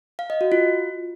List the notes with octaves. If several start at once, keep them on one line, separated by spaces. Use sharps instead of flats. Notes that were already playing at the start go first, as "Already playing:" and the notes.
F5
D#5
F#4
F4